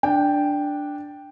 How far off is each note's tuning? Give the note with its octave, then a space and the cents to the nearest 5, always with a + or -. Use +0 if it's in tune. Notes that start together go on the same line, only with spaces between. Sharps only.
D4 +0 G5 +0